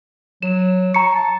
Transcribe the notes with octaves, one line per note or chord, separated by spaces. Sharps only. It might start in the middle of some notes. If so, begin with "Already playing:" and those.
F#3 E7
A#5 C#6 C#7
A5